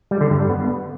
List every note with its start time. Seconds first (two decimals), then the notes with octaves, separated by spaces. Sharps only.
0.11 G3
0.21 D3
0.30 G2
0.40 G3
0.50 B3